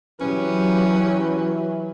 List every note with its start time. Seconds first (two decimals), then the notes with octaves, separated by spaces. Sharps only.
0.20 E3 F#3 C#4 G4 B4